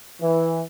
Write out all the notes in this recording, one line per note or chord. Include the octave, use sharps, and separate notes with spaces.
E3